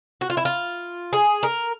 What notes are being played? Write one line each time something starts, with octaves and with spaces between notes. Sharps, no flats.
F#4
F4
E4
F4
G#4
A#4